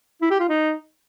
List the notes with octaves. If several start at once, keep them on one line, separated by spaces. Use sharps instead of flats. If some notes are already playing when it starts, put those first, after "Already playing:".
E4
G4
F4
D#4